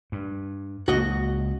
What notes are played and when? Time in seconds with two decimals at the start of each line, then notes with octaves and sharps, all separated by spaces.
0.12 G2
0.88 C#2 A#3 F#4 D#5